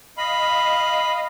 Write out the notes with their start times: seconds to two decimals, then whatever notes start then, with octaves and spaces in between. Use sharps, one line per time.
0.18 D#5 F5 B5